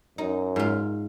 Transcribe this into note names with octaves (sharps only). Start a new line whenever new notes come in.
F#2 D#4
G#2 F4